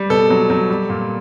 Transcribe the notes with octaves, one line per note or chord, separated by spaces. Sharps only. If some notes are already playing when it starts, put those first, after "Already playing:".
Already playing: G3
B2 A4
F#3
F#3
G3
A#2